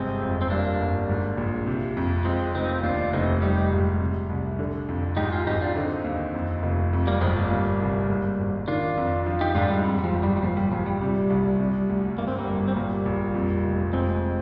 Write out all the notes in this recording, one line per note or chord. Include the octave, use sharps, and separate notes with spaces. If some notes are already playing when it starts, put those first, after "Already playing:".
Already playing: G1 C3 G#3 C4
F2
C4
G2 A#3 D4
G1
G#2
A#1
C3
F2
F2 G#3 C4
F1 C4 D#4
D#2 D4 F4
F1 C4 D#4
G3 D#4 G4
G#2
C3
C2
D3
F2
G#2 D#4 G4
F4 G#4
G#1 D#4 G4
D4 F4
D3 C4 D#4
D#2
F2
F1
F2
G3 A#3
G1 F3 G#3
G3 A#3
A#2
C2
G#2
G#1
D#3 D4 F4
F2
F3
D#4 G4
G#2 D4 F4
G3
F2 G3
G3
F3
G1
G3
G3
A#2 F3
G3
A#1 F3
G3
C3 G3
C2
C3
D2
G2 A#3
C4
G3 A#3
G1
C4
A#2 G3 A#3
A#1
F2
F1
F2 G#3 C4